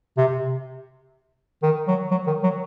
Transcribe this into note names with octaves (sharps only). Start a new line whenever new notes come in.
C3
D#3
F#3
F#3
D#3
F#3